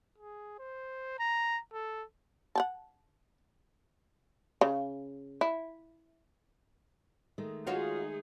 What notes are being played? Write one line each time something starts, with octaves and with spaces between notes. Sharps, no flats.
G#4
C5
A#5
A4
F#5 G5 A5
C#3
E4
D#3 G#3 A3
D#4 F4 F#4 G#4 C#5